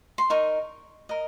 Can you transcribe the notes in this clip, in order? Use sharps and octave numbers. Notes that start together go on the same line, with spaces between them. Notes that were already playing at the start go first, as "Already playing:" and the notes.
C6
D#4 A#4 D#5 C#6
A#4 D#5